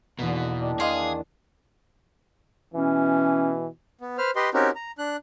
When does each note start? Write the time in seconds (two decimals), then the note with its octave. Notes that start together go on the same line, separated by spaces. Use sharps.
0.19 E2 B2 D3 A#3
0.61 D#3 D4
0.80 G#4 D#5 F5 C6
2.75 B2 E3 C#4
4.01 B3
4.18 B4 C5 F6
4.36 G4 B4 D#5 C6
4.54 C4 C#4 D#4 F#4 G4 A#4
4.75 A#5
4.98 D4 F#6